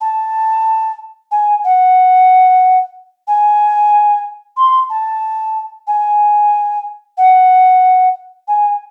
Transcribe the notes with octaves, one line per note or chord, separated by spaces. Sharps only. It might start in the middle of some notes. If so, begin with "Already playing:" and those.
A5
G#5
F#5
G#5
C6
A5
G#5
F#5
G#5